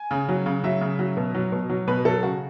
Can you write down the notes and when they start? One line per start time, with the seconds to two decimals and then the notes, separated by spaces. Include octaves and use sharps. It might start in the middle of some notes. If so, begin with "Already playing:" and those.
Already playing: G#5
0.11 C#3
0.29 F#3
0.46 C#3
0.64 F#3 E5
0.81 C#3
0.99 F#3
1.17 B2
1.35 F#3
1.52 B2
1.70 F#3
1.87 B2 B4
2.05 F#3 A4
2.23 C#3 F#4